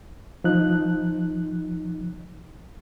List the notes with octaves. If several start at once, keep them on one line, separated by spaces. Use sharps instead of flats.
F3 D#4 F#6